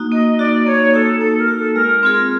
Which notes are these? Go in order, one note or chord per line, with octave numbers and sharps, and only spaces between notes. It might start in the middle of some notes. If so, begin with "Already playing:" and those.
Already playing: A#3 D#4 F#4
A#3 D#5
D#4 F#4 D5
A#3 C#5
D#4 F#4 A4
A#3 A4
A#4
D#4 F#4
A4
G#3 A#4
C4 F4 G#4